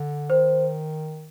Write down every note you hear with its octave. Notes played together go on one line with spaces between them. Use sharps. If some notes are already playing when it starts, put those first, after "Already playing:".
Already playing: D3
D#3 C5